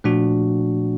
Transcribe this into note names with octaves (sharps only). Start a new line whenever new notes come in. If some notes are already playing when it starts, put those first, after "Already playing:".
A#2 F3 A3 D4 F#4